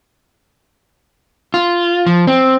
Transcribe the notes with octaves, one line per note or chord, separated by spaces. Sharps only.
F4
F3
C4